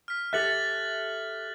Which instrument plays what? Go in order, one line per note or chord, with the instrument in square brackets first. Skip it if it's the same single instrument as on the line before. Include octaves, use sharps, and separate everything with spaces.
[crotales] F6 B6
[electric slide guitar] G4 A4 E5 [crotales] F#6 A6 F#7